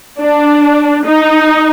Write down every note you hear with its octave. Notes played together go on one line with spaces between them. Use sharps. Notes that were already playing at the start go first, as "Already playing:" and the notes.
D4
D#4